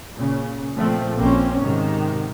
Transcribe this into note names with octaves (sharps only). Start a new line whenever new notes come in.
A#2 C#3
A#2 F3 A3 C4
A#1 A#3 C4 C#4
G#2 C3 D#3